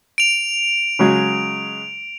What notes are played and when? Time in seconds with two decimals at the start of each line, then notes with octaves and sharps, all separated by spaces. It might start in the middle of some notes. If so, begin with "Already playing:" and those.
0.18 D7 F7
0.99 C#3 F#3 G#3